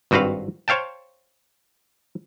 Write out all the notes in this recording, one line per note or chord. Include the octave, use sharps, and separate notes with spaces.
G#1 G2 C4 F#4 B4 F5
C5 C#5 F5 G5 A5